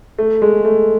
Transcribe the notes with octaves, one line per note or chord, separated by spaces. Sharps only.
A3
G#3
A3